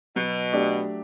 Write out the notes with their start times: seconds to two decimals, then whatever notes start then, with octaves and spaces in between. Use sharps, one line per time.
0.16 B2 F#3
0.53 A3 D4 G4 D5